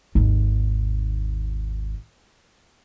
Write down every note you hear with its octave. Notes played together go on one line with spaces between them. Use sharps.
G#1 D#2